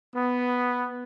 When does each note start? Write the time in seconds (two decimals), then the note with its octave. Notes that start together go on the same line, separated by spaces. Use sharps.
0.15 B3